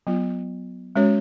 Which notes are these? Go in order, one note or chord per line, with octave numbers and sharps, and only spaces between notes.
F#3 B3 F4
G#3 C#4 F#4 C#5